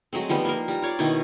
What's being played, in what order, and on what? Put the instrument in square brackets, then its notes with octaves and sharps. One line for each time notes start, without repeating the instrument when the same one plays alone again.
[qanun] F#3 G#3 A3 C4
F3 G3 B3 D#4
A#3 F4 A#4
G3 A#5
F4 C#5 D5 D6
B2 D#3 D#4 E4